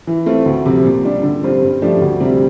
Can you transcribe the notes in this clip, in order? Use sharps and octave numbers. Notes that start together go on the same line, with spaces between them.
E3
A3 C4 F4
D2
C3 F3 C4
A#2
G3 D4 G4
D3
G3 C4 F4 C5
G2
F3 A3 D4 G4
D2
C3 G3 C4